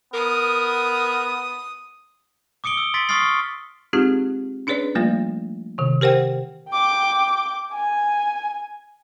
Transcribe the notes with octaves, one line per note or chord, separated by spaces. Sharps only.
B3 A#4 D#6
D6 D#6 C#7 D7 G7
E6
C6 A6 B6 D7
C#6 D#6 F6 A6 C7
C#6
G#3 C4 D#4 F4 G4 G#4
C#4 D4 G#4 B4 C#5 D5
F3 G3 A3 A#3 F4
C3 D#3
G4 A#4 C5 F#5 G5
G5 D6
G#5